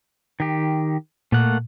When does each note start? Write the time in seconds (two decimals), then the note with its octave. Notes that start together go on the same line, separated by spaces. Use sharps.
0.40 D#3 G4
1.32 A#2 A3 A#3 F#5